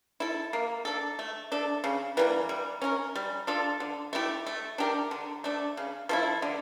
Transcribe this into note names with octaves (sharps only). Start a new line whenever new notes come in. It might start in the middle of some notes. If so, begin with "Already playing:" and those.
E4 A4
A#3
D4 A4
A3
D4 A4
C#3
E3 G3 A#3
G3
C#4 F4 A#4
G3
D4 F4 A4
D3
A3 E4 G4
A3
D4 G4 A#4
D3
A3 D4
C#3
F3 A3 E4
D3